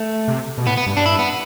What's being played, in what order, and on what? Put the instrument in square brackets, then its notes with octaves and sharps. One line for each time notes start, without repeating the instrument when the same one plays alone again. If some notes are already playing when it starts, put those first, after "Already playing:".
Already playing: [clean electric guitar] A3
[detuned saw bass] C3
B2
[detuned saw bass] A2 [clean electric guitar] B3
[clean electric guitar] B3
[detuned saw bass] G2
[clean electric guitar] D4
E4
B3